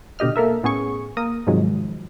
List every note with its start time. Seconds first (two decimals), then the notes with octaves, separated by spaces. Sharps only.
0.19 B2 D3 G4 D#5 F6
0.36 A#3 A4 A#4 E5
0.63 A2 B3 C#4 G#4 C#6
1.17 A#3 A#4 D#6
1.47 G#2 C3 D#3 F3 F#3 G#3